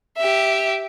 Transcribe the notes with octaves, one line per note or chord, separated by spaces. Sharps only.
G4 E5